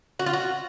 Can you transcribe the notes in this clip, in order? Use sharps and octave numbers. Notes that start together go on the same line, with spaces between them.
F#4
F4
F#4